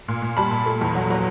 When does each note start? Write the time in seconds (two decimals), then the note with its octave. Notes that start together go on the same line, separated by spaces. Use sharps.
0.08 A#2
0.22 A#2
0.37 G3 A5 B5
0.51 A#2
0.66 A3
0.81 E2
0.95 F#3
1.10 F#3